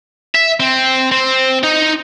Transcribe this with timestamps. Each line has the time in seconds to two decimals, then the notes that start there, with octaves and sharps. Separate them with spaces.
0.35 E5
0.60 C4
1.11 C4
1.63 D#4